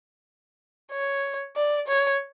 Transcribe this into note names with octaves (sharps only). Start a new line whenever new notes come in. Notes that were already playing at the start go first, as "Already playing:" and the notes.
C#5
D5
C#5